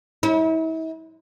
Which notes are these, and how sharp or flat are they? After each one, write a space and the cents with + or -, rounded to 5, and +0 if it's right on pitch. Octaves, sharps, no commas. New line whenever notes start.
E4 -40